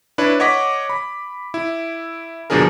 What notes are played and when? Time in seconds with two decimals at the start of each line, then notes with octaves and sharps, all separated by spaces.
0.18 D4 E4 B4 C#5
0.40 C#5 D#5 F#5 D6 B6
0.90 B5
1.54 E4
2.50 G1 B2 F3 D4 G#4 A#4